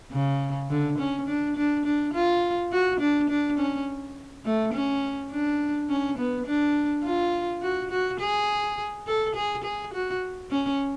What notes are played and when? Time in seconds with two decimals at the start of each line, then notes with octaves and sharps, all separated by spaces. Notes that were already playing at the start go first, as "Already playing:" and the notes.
0.12 C#3
0.70 D3
0.99 C#4
1.27 D4
1.56 D4
1.86 D4
2.14 F4
2.72 F#4
3.00 D4
3.30 D4
3.58 C#4
4.45 A3
4.74 C#4
5.31 D4
5.90 C#4
6.18 B3
6.47 D4
7.05 F4
7.62 F#4
7.91 F#4
8.20 G#4
9.07 A4
9.35 G#4
9.64 G#4
9.94 F#4
10.51 C#4